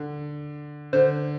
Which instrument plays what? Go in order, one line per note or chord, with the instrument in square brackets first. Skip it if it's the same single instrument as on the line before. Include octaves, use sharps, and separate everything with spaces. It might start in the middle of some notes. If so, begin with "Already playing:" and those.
Already playing: [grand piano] D3
[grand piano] D3 [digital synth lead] C5